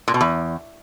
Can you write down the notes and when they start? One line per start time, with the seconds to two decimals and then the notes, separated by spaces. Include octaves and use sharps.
0.08 A#2
0.14 B2
0.21 E2